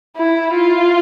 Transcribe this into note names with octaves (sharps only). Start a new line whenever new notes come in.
E4
F4